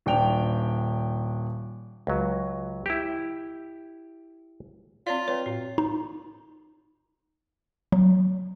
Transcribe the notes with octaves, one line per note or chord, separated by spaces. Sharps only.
D#1 D4 G5 F7
C#2 F#3
E4 G4
C4 F4 C#5 D5
B4 C#5 D5 G5
A2
D#4
F#3